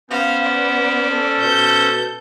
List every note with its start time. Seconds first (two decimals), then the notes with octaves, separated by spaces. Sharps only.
0.11 B3 C#4 C5 F5
0.44 D5
1.09 A4
1.40 B2 G6